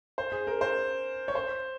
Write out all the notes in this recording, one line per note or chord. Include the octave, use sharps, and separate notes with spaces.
C5
G#4
A#4
C5
C#5
C5